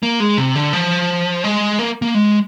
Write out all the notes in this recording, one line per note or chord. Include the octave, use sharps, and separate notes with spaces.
A#3
G#3
C3
D3
F3
G#3
A#3
A#3
G#3